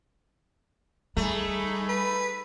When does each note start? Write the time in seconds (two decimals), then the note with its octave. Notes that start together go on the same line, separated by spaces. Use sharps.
1.17 G3 A3 D#4 G#4 B5
1.89 B4